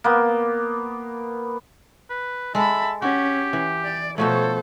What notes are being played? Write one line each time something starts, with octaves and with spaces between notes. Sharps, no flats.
A#3 B3
B4
G#3 A4 E5 A5 B5
C#4 F#4 G4
E3
D5
B2 F3 A3 A4 C5 C#5